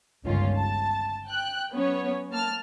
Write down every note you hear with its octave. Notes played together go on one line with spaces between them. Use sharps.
G1 C#2 D#3 C#4 F4
A5
G5 F#6
F#3 B3 C#4 C#5
A#3 A5 F6